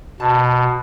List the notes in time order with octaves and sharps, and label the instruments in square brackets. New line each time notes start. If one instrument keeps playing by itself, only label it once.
[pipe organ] B2 [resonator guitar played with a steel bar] A5